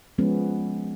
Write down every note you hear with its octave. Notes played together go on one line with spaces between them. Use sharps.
F3 G#3 B3 C#4